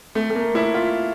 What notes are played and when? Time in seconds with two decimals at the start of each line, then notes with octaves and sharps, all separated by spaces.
0.15 A3
0.30 A3
0.35 A#3
0.55 E4
0.74 F4